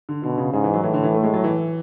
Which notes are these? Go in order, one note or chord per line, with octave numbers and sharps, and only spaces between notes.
D3
B2 D3
C#3
G#2 C#3
E3
F#3
A2 E3
D3
E3
A3
G#3
F#3
E3